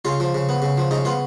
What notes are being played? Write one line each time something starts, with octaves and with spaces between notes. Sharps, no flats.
C#3 F4
F3
C#3
B3
C#3
F3
C#3 D#4
B3 F4